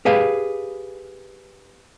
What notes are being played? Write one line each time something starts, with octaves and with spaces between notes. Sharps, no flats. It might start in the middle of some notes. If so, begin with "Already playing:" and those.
G4 G#4 B4 F5